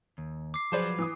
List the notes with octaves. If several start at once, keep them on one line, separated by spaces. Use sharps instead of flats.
D#2
D6 C7
F3 F#3 G#4 B4 C5 D5
E3 D#6